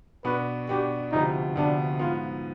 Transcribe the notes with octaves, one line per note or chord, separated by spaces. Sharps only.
B2 B3 D4 B4
B2 B3 D4 G4
D2 C3 F3 B3 D#4
D2 C3 F3 B3 D4
G#2 F3 B3 F4